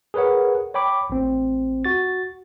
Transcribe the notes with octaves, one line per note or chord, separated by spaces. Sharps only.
G#4 A#4 B4 C#5 F#5
C#5 G5 B5 D6
A1 C4
F#4 A6